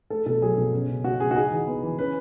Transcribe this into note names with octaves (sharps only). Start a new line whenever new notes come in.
A3 A4
B2 A4
F#3 G#4
B2
C#4
C#3
G#3 F#4
C#3 G#4
F#4
D#4 G#4
E3
B3
E3
C#4 B4